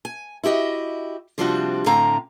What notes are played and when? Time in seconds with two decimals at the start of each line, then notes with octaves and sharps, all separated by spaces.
0.05 G#5
0.43 E4 F#4 G4 D#5
1.38 C3 F3 G3 C4 D4 F#4
1.86 A2 D3 C4 F5 A#5